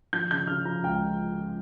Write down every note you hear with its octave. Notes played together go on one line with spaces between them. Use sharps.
F3 G6
C#3 G6
C#3 F6
F3 A#5
C#2 G5